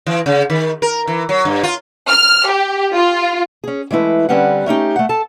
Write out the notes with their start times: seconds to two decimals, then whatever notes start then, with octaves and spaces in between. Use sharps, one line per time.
0.06 E3
0.26 C#3
0.50 D#3
0.82 A#4
1.07 E3
1.29 F#3
1.45 G2
1.63 F4
2.09 F6
2.48 G4
2.94 F4
3.64 C#4 G#4
3.91 E3 G#3 A3 E4 B4
4.29 D3 G3 C4 C#4 B4 F#5
4.66 A3 C#4 D#4 G4
4.96 A3 F#5
5.09 A4 A5